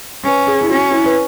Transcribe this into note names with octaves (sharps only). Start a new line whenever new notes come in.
C#4 B4
G#4
E4
C#4 F#4
E4
B4